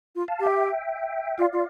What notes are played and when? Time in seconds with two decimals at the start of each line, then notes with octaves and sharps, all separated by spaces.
0.15 F4
0.28 F5 A5
0.40 G4
0.46 E5 G5
1.38 F4 D5 F5
1.53 F4